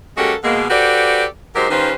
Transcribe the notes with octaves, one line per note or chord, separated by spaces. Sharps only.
G#3 A#3 C#4 F#4 G4 A4
B2 G#3 A#3
F#4 G4 A4 B4 C5 D5
F#3 G#3 D#4 G4 A#4 C5
D#3 G3 C#4 F4 B4 C5